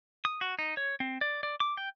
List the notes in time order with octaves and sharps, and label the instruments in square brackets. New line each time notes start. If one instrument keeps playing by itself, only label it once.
[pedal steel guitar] D#6
F#4
D#4
C#5
C4
D5
D5
D6
G5